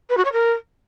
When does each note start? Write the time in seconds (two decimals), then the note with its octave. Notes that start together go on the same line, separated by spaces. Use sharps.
0.10 B4
0.17 F#4
0.25 C#5
0.32 A#4